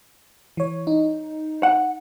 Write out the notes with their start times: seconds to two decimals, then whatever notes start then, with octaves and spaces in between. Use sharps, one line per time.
0.57 E3 C#5
0.87 D#4
1.63 F#5